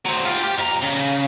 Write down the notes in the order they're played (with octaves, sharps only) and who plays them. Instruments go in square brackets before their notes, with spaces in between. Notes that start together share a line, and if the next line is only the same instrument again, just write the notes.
[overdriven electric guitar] F#3 C4
F4 G4
G4
F2 A#5
C#3